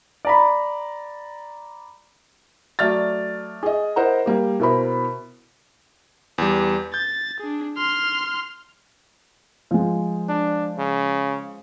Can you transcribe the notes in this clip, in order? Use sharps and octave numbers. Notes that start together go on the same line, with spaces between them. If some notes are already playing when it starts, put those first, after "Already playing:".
D5 A#5 B5
F#3 A3 D5 F6 A6
G#4 D#5
E4 A#4 C5 D#5 F#5 A#5
G3 A#3 G4
B2 E4 A#4 C5 B5
E2 G3
G6 A6
D4 G#4
C6 F6
F3 G#3
D4
C#3